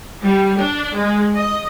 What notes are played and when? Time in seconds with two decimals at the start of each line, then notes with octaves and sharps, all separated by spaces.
0.23 G3
0.57 D4
0.95 G#3
1.35 D#5